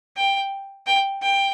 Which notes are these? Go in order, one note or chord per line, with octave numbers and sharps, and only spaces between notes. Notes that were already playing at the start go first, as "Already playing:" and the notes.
G5
G5
G5